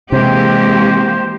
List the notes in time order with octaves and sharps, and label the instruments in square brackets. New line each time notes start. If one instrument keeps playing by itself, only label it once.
[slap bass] C3 [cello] E3 G#3 [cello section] A#3 G4 [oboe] C5